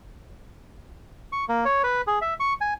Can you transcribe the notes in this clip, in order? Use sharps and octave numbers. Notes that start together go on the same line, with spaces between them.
C#6
A#3
C#5
B4
G#4
E5
C#6
G#5